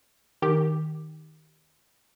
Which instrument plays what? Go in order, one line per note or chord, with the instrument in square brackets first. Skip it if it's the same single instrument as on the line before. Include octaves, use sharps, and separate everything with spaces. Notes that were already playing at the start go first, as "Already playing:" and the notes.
[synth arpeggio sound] D#3 G4